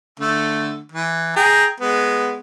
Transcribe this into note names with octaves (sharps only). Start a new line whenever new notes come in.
D3 A3
E3
G#4 G5 A#5
G#3 B3